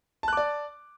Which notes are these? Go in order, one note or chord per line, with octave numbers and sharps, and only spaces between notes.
D5 A5 D6 F#6